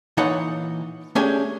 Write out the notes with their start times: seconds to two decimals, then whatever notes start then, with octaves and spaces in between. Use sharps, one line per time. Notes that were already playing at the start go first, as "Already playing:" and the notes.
0.17 A#2 E3 D#4 A4 C#5 F#5
1.15 A3 C#4 D4 G4 G#4 G#5